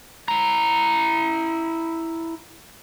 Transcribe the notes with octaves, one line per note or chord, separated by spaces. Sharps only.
E4 A#5